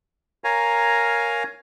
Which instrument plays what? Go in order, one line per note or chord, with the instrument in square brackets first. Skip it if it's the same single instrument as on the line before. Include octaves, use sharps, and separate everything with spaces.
[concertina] A#4 C#5 F5 G#5 A#5